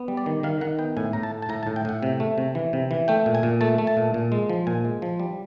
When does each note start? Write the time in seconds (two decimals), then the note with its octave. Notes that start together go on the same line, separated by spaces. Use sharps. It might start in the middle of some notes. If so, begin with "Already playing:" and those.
Already playing: B3
0.08 G3
0.17 D5
0.26 D#3
0.43 D#3 F5
0.61 D#3 F#5
0.78 B3 G5
0.97 A2 G#5
1.13 A2 A#5
1.23 A5
1.31 A3
1.42 A5
1.49 A2 A#5
1.63 A5
1.67 A2
1.76 G5
1.85 A2 F#5
2.03 C3
2.20 A3
2.38 C3
2.55 E3
2.73 C3
2.91 E3
3.08 A3 G5
3.26 A#2
3.35 G#5
3.43 A#2
3.61 A3 A5
3.78 A3
3.87 A5
3.97 A#2
4.14 A#2
4.32 G#3
4.49 F3
4.67 A#2 G#5
4.85 G#3
5.02 F3
5.20 G3